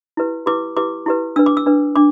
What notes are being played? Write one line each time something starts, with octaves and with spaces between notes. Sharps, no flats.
E4 G4 B4
E4 G4 B4 D6
E4 G4 B4 D6
E4 G4 B4
D4 B4 E6
D6
E6
D4 B4
D4 D6